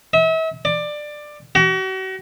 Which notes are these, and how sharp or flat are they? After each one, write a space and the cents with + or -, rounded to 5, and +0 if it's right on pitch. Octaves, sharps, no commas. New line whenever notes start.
E5 -40
D5 +15
F#4 +40